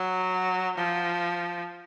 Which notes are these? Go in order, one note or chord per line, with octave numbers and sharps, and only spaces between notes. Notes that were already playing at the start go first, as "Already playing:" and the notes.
Already playing: F#3
F3